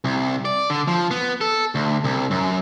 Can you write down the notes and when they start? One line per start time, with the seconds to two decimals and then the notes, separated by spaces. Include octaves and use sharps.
0.04 C2
0.45 D5
0.70 D3
0.88 F3
1.11 B3
1.41 A4
1.75 D2
2.04 C2
2.31 F#2